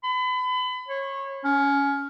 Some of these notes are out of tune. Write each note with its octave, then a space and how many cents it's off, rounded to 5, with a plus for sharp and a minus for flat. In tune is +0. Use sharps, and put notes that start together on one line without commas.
B5 +35
C#5 -25
C#4 +20